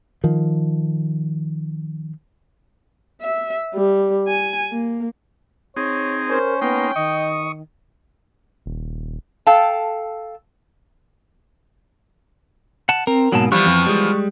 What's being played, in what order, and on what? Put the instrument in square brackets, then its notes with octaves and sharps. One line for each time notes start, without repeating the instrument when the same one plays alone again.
[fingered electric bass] D#3 F3
[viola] E5
G3
G#5
A#3
[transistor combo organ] C4 D#4 G#4 [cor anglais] C#5
[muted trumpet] C#4 [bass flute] A#4 [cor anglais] C5
[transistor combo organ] A#3 D#4 C6 [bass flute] B3 [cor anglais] G5
[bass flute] D#3 [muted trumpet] D#5 [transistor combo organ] C#6 D#6
[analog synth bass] D#1
[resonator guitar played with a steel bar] A4 F5 G5 A5
[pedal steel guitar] F#5 A5
[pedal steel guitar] C4 [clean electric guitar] A#4
[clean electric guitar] G#2 B2 A#3 [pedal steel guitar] F#3 A5
[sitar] E3 F3 B3 [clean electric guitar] G3 [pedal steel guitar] C#6 F#6
[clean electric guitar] F2
G3 G#3